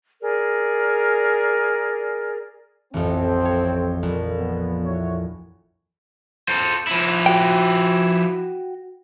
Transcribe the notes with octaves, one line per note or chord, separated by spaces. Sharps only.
G#4 A#4 D5
A1 F2 C4
C#5
A#1
B3
E4 F#4 C#5
A4 C5
F3 E4
F#4 G5